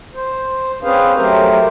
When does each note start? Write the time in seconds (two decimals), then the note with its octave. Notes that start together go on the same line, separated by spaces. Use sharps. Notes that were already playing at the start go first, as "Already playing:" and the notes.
0.15 C5
0.83 C4 C#4 G#4 B4 C5 F5
1.16 F#3 A3 G4 A#4 C5